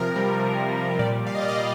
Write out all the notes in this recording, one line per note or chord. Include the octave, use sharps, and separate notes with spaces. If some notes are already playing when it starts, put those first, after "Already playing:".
Already playing: C3 F3 A#4
G3
C3
G3
A#2 D5
G3 F5
D#5
D5
D#5
A#2